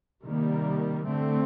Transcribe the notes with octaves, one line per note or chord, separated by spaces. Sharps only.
C3 D#3 G3 A#3
D3 A3 C4